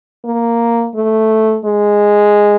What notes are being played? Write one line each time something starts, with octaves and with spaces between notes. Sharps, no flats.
A#3
A3
G#3